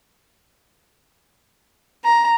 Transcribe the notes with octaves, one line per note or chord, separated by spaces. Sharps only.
A#5